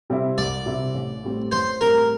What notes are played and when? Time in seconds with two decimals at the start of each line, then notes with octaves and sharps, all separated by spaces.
0.10 C3 G3 C4 E4
0.38 C2 D5
0.66 C3 G3 C4 E4
0.94 A1
1.23 A2 G3 C4
1.52 A1 C5
1.80 A2 G3 C4 A#4